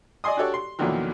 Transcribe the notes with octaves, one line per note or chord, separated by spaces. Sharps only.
D5 D#5 G#5 C6 D#6
D4 F#4 G4 A4 C#5 D5
C6
E2 A#2 D3 D#3 F3 F#3